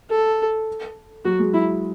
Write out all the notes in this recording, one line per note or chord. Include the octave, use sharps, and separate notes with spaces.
A4
F#3 F#4
G#3
F#3 E4